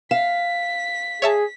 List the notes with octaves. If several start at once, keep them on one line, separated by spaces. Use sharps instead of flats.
F5 B6 E7
G#4 C#5 E5 A5